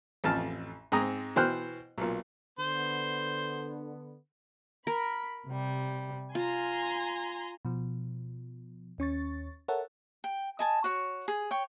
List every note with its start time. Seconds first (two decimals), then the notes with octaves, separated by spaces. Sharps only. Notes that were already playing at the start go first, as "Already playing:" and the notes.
0.24 A1 F2 A5 F6
0.92 G#2 G#3 C4 A#5 D#6
1.36 B2 E3 C5 G5 F6 F#6
1.98 B1 A#2
2.59 D3 B3 C5
4.87 A#4 B5
5.46 C3 G3
6.35 F4 G#5 A#5 C6
7.65 B2 F3
8.98 D#2 C#4 C#6 A6
9.68 A4 A#4 C#5 E5 F#5 A5
10.24 G5
10.59 D#5 G#5 A5
10.84 F#4 C#5
11.28 G#4
11.51 C#5 G5